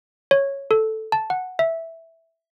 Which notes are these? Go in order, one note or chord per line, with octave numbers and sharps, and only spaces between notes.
C#5
A4
A5
F#5
E5